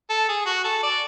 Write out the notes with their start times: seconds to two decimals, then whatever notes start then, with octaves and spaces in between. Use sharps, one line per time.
0.10 A4
0.29 G#4
0.46 F#4
0.64 A4
0.83 D5